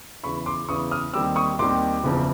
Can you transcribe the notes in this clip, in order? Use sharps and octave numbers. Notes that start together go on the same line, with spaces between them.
E2 C#3 E3 B5 C#6
C6 D6
E2 C#3 E3 C#6 D#6
D#6 F6
D#2 D#3 G3 C4 D6 E6
C#6 D#6
D#2 D#3 G3 C4 C6 D6
F#1 E2 C#3 F3